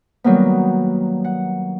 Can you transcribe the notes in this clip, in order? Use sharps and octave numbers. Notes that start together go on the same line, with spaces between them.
D#3 F#3 G3 A#3 B3
F#5